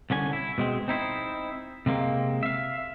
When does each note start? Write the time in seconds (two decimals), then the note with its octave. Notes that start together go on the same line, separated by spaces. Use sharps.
0.10 C2 D3 C#4 G#5
0.33 E4
0.58 B2 G#3 C4
0.88 C4 D#4 E4 C5
1.86 C3 G#3 A#3 C4
2.43 E5 F5